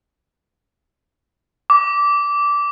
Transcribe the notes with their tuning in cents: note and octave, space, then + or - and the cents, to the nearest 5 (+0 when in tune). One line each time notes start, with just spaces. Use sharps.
D6 -15